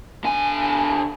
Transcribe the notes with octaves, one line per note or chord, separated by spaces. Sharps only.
D3 G#5